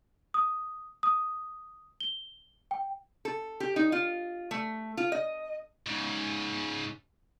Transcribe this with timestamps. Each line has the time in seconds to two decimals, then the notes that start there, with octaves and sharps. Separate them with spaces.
0.34 D#6
1.03 D#6
2.00 G7
2.71 G5
3.25 A4
3.60 G4
3.76 D#4
3.92 F4
4.51 A3
4.97 F4
5.12 D#5
5.86 G#2 C#3